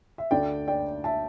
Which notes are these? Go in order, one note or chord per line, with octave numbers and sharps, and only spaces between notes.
E5
D2 D3 A3 D4 D5 G5
D5 G5
E5 A5